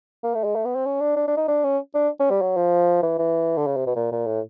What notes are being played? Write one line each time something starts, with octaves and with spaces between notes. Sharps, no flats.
A#3
A3
G#3
A3
B3
C4
C#4
D4
D4
D4
D#4
D4
C#4
D4
C#4
G3
F#3
F3
E3
E3
D3
C#3
C3
B2
A#2
A#2
A2